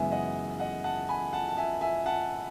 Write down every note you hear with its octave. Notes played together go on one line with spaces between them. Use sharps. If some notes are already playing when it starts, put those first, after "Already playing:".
Already playing: F#2 C#3 E3 G#3 B3 E5 G#5
D#5 F#5
D#5 F#5
F#5 A5
G#5 B5
F#5 A5
A5
E5 G#5
E5 G#5
F#5 A5